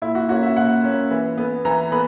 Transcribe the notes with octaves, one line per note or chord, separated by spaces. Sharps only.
A#2 E4
F#4
A#3 C#4 F#4
E5
A#2 F#5
A#3 C#4
E3
B3
E3 A#5
B3 B5